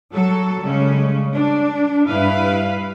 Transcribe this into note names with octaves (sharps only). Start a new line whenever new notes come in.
F#3 A4
C#3 G3 G#3 C#4
D4
G2 E4 B4 F5